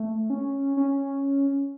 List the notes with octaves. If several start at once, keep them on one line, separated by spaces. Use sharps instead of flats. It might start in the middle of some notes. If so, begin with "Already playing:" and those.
Already playing: A3
C#4
C#4